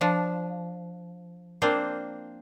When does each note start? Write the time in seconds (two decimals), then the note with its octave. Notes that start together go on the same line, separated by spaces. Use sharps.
0.01 F3 D4
1.62 A#3 C4 D4 F4 C5